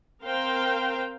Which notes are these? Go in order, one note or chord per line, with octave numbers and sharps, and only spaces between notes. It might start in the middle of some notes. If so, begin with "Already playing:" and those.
C4 A#4 C5 F5 G5